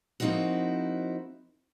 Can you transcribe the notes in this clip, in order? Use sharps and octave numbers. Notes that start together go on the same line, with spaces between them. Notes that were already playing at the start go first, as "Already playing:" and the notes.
F3 A#3 C4 D#4 E4 F#4